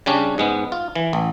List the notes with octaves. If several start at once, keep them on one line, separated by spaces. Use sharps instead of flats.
C#3 G3 C#4 D4
G#2 G#3 B3
F4
E3
A1